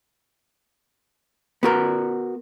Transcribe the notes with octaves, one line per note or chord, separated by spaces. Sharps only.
B3 F#4 A#4